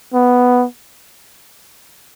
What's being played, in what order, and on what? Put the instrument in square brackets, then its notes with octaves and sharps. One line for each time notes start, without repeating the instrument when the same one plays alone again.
[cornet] B3